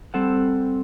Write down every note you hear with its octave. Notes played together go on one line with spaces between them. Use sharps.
G3 C4 A4 F#5